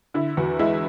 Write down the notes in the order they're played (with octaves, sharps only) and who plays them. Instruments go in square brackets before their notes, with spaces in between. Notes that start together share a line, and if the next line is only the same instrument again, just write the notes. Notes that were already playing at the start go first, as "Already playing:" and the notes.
[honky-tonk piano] D3 E4
E2 F#4
G#3 E4